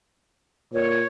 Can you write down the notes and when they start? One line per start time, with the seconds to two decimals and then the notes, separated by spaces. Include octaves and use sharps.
0.73 A#2 C#5